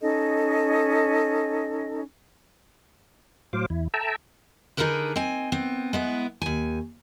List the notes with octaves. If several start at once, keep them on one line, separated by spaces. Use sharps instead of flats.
C#4 D#4 A4 D#5
A2 F#3 C5 F5 D6
E2 E4
A4 E5 G5 A5 A#5 E6
D3 D#4 F#4 G#4 A#4 B4
C4 D#5 G#5
B3 C4
G#3 B3 E4
D#2 G#5